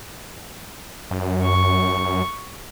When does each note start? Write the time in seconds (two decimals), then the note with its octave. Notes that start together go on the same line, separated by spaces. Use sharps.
1.11 F#2
1.44 C#6